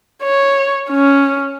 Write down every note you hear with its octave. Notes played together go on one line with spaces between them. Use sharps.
C#5
C#4